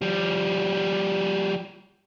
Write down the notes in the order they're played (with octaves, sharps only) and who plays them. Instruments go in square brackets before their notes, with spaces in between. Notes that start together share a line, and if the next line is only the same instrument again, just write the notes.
[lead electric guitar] F3 G3